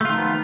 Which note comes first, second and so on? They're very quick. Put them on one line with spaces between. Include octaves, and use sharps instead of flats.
A3 F4 D#3 F3 B3